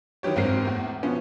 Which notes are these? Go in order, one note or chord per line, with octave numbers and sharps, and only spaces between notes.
D#3 E3 F#3 G4 C#5
G#1 G#2 C4 A#4 C7
E2 A2
B2 F3 B3 C#4